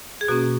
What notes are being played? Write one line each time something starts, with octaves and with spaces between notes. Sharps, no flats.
G#4
B2 A#3 C#4 F#4